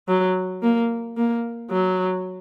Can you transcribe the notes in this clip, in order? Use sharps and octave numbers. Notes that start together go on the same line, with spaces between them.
F#3
A#3
A#3
F#3